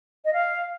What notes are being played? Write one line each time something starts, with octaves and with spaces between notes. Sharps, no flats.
D#5
F5